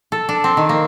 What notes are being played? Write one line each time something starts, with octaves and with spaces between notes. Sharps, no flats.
A4
D4
C4
D#3
A#3